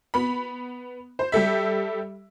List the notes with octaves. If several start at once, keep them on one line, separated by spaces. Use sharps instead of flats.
B3 B5
C5
G3 G4 A4 E5